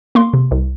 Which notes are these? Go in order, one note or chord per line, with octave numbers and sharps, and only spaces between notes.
A#3 C6
C3
C2